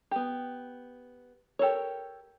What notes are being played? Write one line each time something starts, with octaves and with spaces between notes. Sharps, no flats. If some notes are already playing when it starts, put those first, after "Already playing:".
B3 G4
G4 A4 A#4 C#5